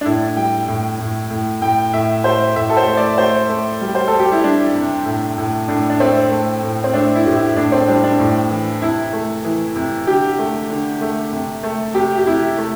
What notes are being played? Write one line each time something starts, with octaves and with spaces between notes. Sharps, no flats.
D4
A2 E4
G3 G5
A2
A2
A2
A2 G5
A2 E5
A3 C5
A2 E5
A4
C5
A3
D5
A3 C5
A3
G3
C5
G3 A4
G4
E4
G3 D4
C3
A2
A2
A2 D4
D4
A3 C4
A3
A2
C4
A3 D4
E4
A2 G4
E4
A2 D4
C4
G3 D4
D4
A2
E3
C3 E4
A3
E3
C3
D3 G4
A3
D3
A3
C3
A3
C3 G4
G4
C3 E4
A3